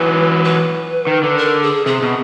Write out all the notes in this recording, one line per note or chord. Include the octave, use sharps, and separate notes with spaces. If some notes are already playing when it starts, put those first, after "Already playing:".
Already playing: E3 F#3 B4
B4
D#3
D3
A#4
G#4
C3 G#4
B2